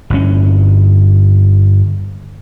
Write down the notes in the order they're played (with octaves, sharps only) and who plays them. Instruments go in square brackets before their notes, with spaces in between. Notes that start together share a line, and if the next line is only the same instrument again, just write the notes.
[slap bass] G1 G2 C#4